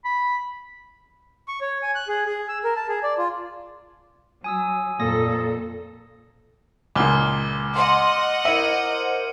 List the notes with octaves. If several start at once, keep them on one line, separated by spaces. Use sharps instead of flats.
B5
C#6
C#5
G#5
F#6
G#4
G#4
E6
A#4
A5
G#4
D5
F4
F#3 G#5 D#6 E6
F2 A#2 A#3 A4 D#6 A#6
C#2 A#2 D6 F6 G7
D#5 F#5 C6
E4 A#4 C5 E5 C#7 D#7 F#7